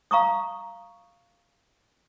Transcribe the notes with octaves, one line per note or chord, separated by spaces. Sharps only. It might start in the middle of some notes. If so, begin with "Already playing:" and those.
F5 A#5 C#6 D#6